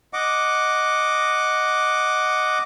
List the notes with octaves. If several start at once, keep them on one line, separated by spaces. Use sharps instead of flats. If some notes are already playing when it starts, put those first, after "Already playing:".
D#5 F#5 D6